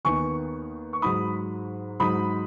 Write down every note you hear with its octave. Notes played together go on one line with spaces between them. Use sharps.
D#2 D#3 B3 D#4 G#5 C#6
C#6
G#2 F#3 D#4 B5 D#6
G#2 F#3 D#4 B5 D#6